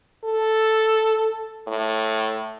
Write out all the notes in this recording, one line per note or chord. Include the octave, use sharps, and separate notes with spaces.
A4
A2